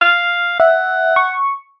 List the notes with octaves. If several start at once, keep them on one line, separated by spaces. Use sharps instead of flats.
F5 F6
E5 F#5
C#6